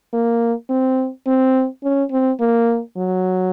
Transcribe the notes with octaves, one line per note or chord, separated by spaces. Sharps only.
A#3
C4
C4
C#4
C4
A#3
F#3